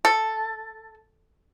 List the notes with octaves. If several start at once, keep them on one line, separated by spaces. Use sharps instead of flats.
A4